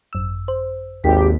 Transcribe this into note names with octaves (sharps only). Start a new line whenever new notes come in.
G#1 F#2 E6
C5
G#1 D#2 G4 B6